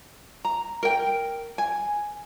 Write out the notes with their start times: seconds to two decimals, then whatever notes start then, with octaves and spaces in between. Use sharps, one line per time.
0.45 A#5
0.83 A#4 G5
1.58 G#5